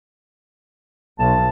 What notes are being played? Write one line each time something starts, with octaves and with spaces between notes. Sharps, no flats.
B1 A5